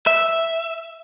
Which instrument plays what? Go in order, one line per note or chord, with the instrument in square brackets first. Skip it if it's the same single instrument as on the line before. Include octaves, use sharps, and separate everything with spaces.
[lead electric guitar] E5